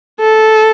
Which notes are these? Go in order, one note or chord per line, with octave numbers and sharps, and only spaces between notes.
A4